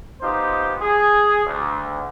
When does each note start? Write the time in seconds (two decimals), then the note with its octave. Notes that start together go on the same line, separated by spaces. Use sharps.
0.22 B3 D#4 F4 G4 C5
0.82 G#4
1.46 D2